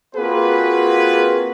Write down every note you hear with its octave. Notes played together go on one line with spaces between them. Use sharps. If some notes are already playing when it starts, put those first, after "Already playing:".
A#3 C4 F4 F#4 G#4 B4